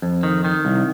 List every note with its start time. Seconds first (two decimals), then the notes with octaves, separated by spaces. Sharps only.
0.02 F2
0.23 D#3
0.45 D#3
0.65 C2